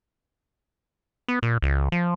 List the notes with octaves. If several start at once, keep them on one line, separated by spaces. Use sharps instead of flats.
B3
A#2
C#2
F3